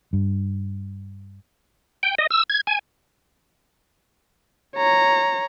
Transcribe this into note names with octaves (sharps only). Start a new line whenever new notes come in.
G2
G5
D#5
E6
G#6
G#5
C#5 A#5